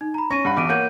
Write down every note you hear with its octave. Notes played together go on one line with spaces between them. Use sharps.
D#4
A#5 B5
C#4 C#6 A#6 D#7
G2 F#5 B5
B1 E2 D6 D7 D#7
A#3 C#5 F#5 D6 G6 D#7